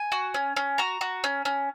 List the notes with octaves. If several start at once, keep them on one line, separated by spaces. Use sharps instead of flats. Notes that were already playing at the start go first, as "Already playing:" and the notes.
Already playing: G#5
F#4
C#4
C#4
F#4 A#5
F#4
C#4
C#4